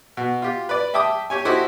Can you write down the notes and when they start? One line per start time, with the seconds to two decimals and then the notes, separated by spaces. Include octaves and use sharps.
0.17 B2
0.42 F4 G4
0.69 B4 D5
0.94 E5 G5 A5 D6 D#6
1.30 G4 C#5 G#5
1.45 E4 F#4 G4 A4 C5 D#5